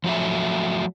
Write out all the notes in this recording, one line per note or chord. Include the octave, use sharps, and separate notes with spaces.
F3 F#3 A3 E5